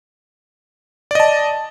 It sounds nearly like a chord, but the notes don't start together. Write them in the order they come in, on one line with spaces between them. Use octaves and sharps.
D5 D#5 A5